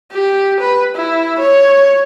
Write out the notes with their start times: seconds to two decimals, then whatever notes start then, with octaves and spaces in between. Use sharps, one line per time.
0.12 G4
0.60 B4
0.95 E4
1.39 C#5